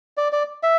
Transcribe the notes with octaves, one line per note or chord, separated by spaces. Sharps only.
D5
D5
E5